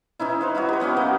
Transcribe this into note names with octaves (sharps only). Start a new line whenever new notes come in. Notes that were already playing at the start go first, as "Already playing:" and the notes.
E3 C#4 D#4 E4
B4 C5 F5
D#4 E4 F#4 C#5
G4 B4
F#3 B3 C#4 F#4
A#3 B3 F#4